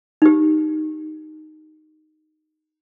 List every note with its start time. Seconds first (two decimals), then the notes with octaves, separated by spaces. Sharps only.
0.22 D#4 G4